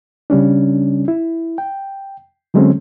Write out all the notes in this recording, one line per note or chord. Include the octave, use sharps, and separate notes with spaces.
C#3 G3 C#4 D4
E4
G5
D3 F#3 G#3 A3 C4 C#4